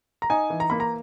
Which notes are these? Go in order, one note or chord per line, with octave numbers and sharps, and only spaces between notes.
A#5
D#4 G#5
E3
A#5
A#3 B5
A#5